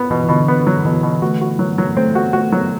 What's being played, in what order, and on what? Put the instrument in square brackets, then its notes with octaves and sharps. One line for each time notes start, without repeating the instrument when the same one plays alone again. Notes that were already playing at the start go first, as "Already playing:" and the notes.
Already playing: [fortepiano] B3
[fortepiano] B2 [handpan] E3
[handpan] E3
[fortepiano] B2 [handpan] D3
[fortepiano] B3
F#3
[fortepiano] B2 [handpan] E3
[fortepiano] B2
[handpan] A3 [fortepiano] F#4
[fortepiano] F#4
F#3
F#3
[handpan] A3 [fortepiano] C4
[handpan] B3 [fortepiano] F#4
[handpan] A3 [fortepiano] F#4
[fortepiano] F#3